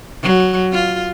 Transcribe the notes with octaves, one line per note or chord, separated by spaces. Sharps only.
F#3
F4